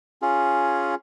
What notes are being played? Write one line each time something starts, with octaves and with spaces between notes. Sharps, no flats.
C#4 F4 G#4